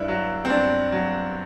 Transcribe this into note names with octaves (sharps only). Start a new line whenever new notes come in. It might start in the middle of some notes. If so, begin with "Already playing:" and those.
Already playing: G2 D4 E4
F#3
C4
G2 D4
F#3